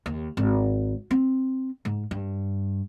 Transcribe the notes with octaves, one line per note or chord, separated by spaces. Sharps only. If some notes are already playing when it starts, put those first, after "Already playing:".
D#2
G#1
C4
G#2
G2